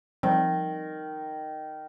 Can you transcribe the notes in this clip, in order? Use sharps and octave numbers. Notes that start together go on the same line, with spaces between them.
D#3 F3 G3 C4